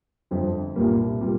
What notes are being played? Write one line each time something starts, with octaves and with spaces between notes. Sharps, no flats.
G1 F2 F3 C4 F4
C2 A#2 G3 A#3
A#2 G3 A#3